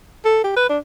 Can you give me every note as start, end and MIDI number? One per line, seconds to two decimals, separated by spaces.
0.25 0.44 69
0.44 0.55 67
0.57 0.69 71
0.69 0.78 62